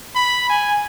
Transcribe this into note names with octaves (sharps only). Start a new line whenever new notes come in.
B5
G#5